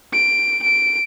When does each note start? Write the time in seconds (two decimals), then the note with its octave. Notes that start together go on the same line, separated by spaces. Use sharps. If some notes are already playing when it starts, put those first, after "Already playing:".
0.13 D7
0.63 D7